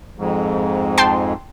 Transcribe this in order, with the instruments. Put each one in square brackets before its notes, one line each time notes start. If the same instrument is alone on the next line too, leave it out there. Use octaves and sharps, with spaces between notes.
[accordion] F2 G#2
[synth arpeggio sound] G5 A5 C6